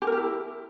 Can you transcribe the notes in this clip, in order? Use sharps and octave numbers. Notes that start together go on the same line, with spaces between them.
G4
A#4
G4
E4